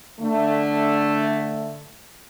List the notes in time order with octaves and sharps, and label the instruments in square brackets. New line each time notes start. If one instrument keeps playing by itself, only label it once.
[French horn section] D3 A3